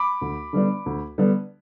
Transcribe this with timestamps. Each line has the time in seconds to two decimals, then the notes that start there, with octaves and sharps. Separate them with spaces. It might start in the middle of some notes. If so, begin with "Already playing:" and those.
Already playing: B5 D6
0.21 D2
0.53 D3 G3 B3 D4
0.86 D2
1.18 D3 G3 B3 D4